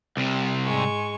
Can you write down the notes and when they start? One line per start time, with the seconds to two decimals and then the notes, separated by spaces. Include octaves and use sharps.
0.17 C2 C3
0.66 G#2 G#3 C#6